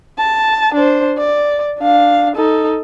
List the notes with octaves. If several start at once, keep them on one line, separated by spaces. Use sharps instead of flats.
A5
D4 C5
D5
D4 F5
D#4 A4